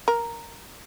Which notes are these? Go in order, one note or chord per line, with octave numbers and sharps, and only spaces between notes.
A#4